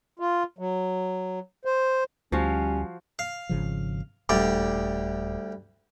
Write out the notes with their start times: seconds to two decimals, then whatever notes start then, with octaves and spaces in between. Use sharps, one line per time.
0.19 F4
0.58 F#3
1.65 C5
2.32 D2 F3 G3 C#4 F#4 F5
3.19 F5
3.49 G#1 C#3 F3
4.29 D#1 D2 G3 D5